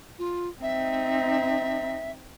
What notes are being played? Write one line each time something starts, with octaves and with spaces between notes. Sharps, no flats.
F4
C4 D#4 E5